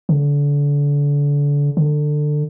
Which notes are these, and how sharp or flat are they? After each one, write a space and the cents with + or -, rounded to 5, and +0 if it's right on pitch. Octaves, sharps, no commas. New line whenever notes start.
D3 -30
D3 +20